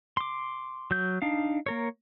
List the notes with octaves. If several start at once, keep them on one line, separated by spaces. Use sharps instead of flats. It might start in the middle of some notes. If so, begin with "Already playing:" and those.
C6 D6
F#3 G6
D4 D#4 F5
A#3 A#4 C#5